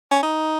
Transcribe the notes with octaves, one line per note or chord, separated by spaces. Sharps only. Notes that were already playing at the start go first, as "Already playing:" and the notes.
C#4
D#4